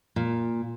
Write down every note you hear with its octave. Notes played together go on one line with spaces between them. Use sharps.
A#2